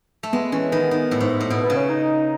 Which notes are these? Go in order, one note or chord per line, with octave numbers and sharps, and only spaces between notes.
A3
G#3 B3
E3 C#4
D#3 B3
D#3
A2
G#2
A2
B2 B3
B3
C#3
C#4
D#4